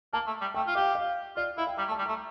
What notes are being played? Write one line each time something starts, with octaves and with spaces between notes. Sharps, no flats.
A#3 A5
A3
G3
A3 G5
F4
G4 F5
F5
F4 D5
E4 F5
G5
G3 A#5
A3
A5
G3
A3 A#5